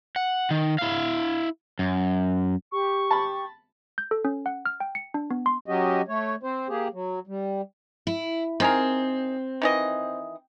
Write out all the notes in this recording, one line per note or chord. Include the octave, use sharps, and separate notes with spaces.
F#5
D#3
E4 F5
F#2
G4 C#6
A5 B5
G6
A4
C#4
F#5
F6
G5
C#7
D4
B3
C6
F#3 C#4 F#4 G4 D#5
A3 C#5
C4 C5
A#3 G4 G#4
F#3
G3
E4
D#3 C4 G#4 A#4
D#3 E3 D#5